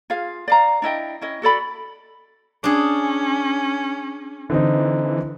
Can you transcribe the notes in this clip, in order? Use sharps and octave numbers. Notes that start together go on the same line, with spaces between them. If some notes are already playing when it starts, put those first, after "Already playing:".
F4 G#4 F5
D5 F5 A#5
D4 E4 D#5 G5
C#4 E4 D#5
F#4 A4 D5 B5
C#4 D4 G#4
D3 E3 C4 D#4